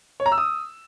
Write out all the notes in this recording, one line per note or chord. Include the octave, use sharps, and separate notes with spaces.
C#5
A#5
E6
D#6